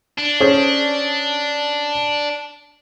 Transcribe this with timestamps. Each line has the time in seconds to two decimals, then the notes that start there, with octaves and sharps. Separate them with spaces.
0.18 D4
0.40 C#4 G#4 C5